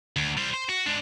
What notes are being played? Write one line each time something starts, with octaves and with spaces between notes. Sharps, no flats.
D2
G3 C5
C5
F#4
G#3 D4